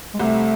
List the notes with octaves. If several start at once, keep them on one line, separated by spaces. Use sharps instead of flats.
G#3
C2 C3 A3